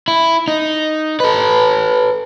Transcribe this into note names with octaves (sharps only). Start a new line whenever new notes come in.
E4
D#4
A4 B4